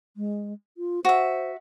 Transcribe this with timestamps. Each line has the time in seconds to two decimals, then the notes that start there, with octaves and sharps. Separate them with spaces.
0.17 G#3
0.78 F4
1.05 F#4 C5 E5